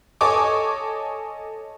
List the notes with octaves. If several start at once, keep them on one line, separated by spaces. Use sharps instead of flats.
A4 C#5 D#5 G#5 C#6 D6